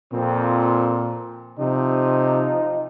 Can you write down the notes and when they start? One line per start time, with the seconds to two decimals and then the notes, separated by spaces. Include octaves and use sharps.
0.13 F2 A#2 C4
1.59 C3 F3 D#4